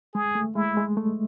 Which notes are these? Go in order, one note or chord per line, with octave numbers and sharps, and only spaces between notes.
G#3 G#4
A3
G#3 E4
G#3
A3